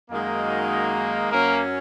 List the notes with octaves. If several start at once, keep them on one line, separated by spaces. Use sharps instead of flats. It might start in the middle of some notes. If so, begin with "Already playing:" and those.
F#2 D#3 G#3 A#3 D#4 F#4
F#2 F#3 A#3 C#4